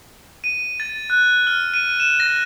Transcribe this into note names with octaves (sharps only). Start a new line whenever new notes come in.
D#7
A6
F#6
F6
D#7
E7
A#6